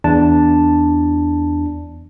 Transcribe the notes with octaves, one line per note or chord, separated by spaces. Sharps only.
E2 D4 A5